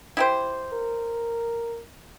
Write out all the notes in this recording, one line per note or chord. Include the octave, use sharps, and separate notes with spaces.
E4 G4 C5
A#4